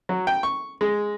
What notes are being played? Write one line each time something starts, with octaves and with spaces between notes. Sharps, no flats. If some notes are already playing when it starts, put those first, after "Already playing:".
F#3
G5
C#6
G#3